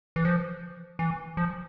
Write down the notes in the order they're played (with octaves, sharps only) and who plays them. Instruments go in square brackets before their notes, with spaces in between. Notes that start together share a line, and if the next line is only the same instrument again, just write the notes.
[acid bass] E3
F3
E3
F3